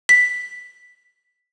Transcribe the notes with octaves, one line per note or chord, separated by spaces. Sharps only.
B6